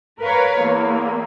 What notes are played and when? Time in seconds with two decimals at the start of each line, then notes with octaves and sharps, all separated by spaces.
0.20 A#4 B4 C#5 F5
0.60 E2 A#3